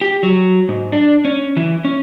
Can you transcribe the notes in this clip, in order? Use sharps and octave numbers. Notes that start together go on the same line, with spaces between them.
G4
F#3
G#2
D4
C#4
E3
C#4